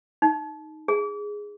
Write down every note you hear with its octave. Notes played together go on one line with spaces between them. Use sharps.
D#4
G#4